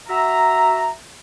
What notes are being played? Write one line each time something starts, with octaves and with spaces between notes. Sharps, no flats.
F#4 E5 A#5